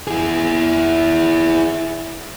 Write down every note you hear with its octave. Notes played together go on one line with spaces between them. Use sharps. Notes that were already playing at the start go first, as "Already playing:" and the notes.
E4 G#4